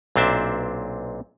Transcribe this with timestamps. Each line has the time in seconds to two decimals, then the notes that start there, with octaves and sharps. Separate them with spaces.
0.16 B1 A#2 C4 D4 C5 E5